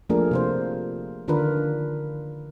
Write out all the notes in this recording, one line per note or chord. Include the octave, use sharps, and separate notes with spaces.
F3 A3 A#3 D4 G#4 A#4
C3 F4 C5
D3 D#3 D4 F4 A#4 B4